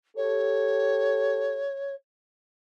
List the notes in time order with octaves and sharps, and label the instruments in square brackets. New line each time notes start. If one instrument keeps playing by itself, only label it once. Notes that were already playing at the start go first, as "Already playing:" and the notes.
[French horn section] G4 A4 [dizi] C#5